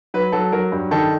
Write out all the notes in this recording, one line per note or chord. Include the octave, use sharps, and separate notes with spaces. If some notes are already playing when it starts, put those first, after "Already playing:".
F#3 B4
F#3 A4
F#3 A#4
G2
D#3 A4